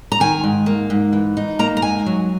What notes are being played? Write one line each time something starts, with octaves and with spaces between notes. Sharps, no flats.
A#5
D#3 G#5
G#2
A#3
G#2
E3
D#4
A#3 A#5
A#5
G#2 G#5
F#3